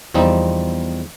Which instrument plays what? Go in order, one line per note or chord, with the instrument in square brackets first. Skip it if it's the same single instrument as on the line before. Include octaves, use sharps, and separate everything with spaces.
[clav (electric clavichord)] E2 F3 G3 C4 D#4